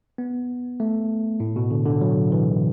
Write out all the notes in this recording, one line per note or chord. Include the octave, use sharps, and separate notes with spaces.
B3
A3
A2
B2
D3
D3
F#3
E3